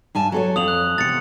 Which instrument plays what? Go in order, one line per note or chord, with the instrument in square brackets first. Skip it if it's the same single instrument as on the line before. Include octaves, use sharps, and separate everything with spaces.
[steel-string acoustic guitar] G2 G#5 A5
F#3 A4 C#5
[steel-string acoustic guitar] F2 [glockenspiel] D#6 F7 F#7
[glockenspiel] F#6
[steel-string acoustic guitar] E2 C3 [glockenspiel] A6 C#7